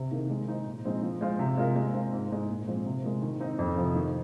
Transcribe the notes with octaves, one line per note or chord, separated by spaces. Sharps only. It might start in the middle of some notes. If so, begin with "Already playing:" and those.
Already playing: C3
D#3 A#3 D#4 G#4
G#3
D#4 C5
A#2
F3 G#3 C4 D#4
F3
G#3 F4 C5
C3
G#3 F4 A#4
G#3
C4 F4
G#2
G#3 D#4
A#2
F3 G#3 C4
C3
G#3 F4 A#4
D#3
C4 D#4
F2
C3 F3
D#3